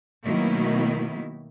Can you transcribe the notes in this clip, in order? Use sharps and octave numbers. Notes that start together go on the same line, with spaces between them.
B2 D#3 F#3 A3 A#3 E4